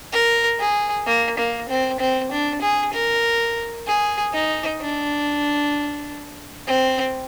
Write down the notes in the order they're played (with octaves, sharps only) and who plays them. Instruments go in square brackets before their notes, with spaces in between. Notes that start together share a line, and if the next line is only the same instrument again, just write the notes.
[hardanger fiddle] A#4
G#4
A#3
A#3
C4
C4
D4
G#4
A#4
G#4
D#4
D4
C4